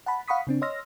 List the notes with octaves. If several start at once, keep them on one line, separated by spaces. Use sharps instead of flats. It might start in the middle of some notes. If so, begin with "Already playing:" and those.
F#5 A5 B5
F5 F#5 B5 C#6 D#6 B6
C#3 C4 D4
C#5 D#5 C6 E6 F6 A#6